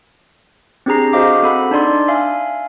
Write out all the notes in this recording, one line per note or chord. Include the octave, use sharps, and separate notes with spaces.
C4 D4 G4 G#4 A#5 C7
F#4 G#4 C5 D#5 F5 D6
C4 A4 F#5 B5
D4 D#4 D5 C6
E5 F5 G#5